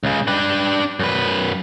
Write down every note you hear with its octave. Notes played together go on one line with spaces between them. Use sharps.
C#2 C#3
D4 B4
F#2 B4